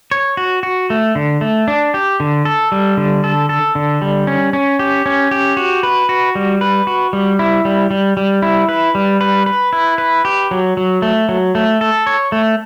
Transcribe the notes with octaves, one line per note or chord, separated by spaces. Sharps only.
C#5
F#4
F#4
A3
D3
A3
D4
G4
D3
A4
G3
D3
A4
A4
D3
G3
C#4
C#4
G4
C#4
G4
F#4
B4
F#4
G3
B4
F#4
G3
E4
G3
G3
G3
E4
B4
G3
B4
B4
E4
B4
G4
F#3
F#3
A3
F#3
A3
A4
C#5
A3